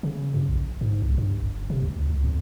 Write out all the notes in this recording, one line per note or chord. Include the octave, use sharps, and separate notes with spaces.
C#3
F#2
A#1
G#2
C2
G2
F#1
C3
D2
C#2
F2